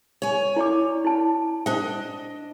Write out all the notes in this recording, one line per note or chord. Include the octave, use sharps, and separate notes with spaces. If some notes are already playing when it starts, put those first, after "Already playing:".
C#5 G#5
E4 D5 D6
E4 A5
D4 C5 D#5 G5